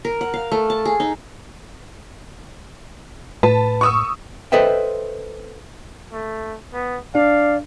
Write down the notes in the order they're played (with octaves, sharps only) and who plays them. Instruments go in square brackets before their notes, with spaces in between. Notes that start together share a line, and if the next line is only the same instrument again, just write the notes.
[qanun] A#4
F#5
F5
A3
A5
G#4
D#4
[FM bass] A2 [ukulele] B4 [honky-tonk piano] A5
[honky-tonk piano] C#6 D#6 E6
[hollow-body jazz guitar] A4 B4 C5 D#5 E5 G5
[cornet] A3
B3
[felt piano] D4 [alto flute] D5 [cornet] F5